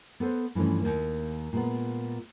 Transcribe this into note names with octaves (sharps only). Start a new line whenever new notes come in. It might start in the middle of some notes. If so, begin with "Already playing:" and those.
B3 A4 B4 C5
G2 E3 F3 A3 C#4
D#2 A#3
A#2 G#3 B3